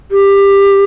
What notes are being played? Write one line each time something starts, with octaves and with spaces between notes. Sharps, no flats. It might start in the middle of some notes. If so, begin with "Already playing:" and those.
G4